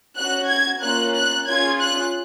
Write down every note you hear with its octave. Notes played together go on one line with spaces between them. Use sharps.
C#4 F#4 F#6
G#6
A#3 C#4 F4 F#6
F#6
C#4 F4 G#4 G#6
F#6